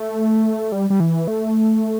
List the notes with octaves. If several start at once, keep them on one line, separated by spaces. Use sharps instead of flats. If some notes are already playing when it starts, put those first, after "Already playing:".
Already playing: A3
G3
G3
E3
A3